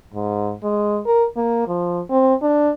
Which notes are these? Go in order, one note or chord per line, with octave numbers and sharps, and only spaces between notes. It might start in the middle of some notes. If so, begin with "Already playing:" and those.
G#2
G#3
A#4
A#3
F3
C4
D4